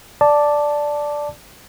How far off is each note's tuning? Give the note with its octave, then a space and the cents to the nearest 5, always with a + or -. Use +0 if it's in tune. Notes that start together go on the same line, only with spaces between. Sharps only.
D5 +0 A5 +0 D6 +0